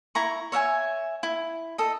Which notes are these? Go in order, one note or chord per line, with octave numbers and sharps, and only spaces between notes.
E4 A#5 C#6
C#5 E5 F#5 G#5
E4
A4 D#5